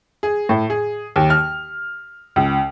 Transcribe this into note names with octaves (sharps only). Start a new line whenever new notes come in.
G#4
A2
G#4
D#2
F6
C#2